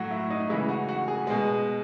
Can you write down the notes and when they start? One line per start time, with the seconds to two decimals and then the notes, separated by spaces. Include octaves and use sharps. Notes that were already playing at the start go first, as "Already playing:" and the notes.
Already playing: A2 F#3 F#4
0.11 E4
0.30 D#4
0.49 C#3 E3 G#3 E4
0.69 F#4
0.88 F#4
1.08 G#4
1.27 B2 G#3